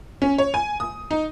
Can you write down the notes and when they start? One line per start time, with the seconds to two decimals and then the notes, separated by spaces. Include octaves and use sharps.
0.22 C#4
0.38 C#5
0.54 G#5
0.80 D#6
1.11 D#4